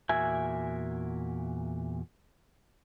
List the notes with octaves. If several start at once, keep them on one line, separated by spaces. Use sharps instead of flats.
E2 A#2 F#4 A#4 E5 G#5